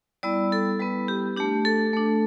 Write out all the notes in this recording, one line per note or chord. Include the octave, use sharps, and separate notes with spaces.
G3 B3 E4 D5
A4
G3 B3 E4 B4
G4
A3 D4 G4
A4
A3 D4